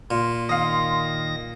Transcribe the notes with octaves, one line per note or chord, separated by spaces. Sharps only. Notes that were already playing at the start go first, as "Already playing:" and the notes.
A#2 C6
D#3 F5 D#6 A#6